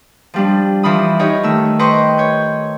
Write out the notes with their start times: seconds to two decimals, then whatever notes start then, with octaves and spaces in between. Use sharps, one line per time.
0.34 F3 G3 D4
0.83 E3 F3 F4 B5 D#6
1.19 D#4 G4 C#5 D#5
1.43 D#3 A3 E6
1.79 B4 C5 D#5 G5 C6 C#6
2.18 C#5 G6